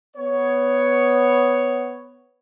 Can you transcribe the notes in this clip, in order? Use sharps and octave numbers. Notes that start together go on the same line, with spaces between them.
B3 C#5